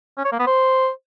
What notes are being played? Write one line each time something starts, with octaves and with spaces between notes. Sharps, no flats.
C#4
C#5
A#3
B3
C5